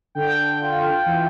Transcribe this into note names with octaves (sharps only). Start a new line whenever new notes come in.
D3 G5
F4
E3